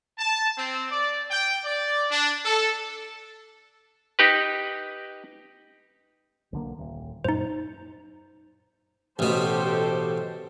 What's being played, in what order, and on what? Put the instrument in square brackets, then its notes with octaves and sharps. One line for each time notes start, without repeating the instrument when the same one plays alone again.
[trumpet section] A5
C4
D5
G5
D5
D4
A4
[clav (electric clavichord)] D#4 G4 B4
[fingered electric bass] B1 D3 A#3
D#1
[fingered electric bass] F#2 A#2 [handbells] D#4 C5
[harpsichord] A1 B2 [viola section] G4 A4 C5